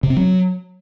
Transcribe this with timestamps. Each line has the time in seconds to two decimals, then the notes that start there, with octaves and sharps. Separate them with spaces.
0.03 C3
0.10 C4
0.17 F#3